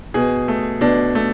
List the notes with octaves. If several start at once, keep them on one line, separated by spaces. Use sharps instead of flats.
B2 G#4
A3
B2 D4
A3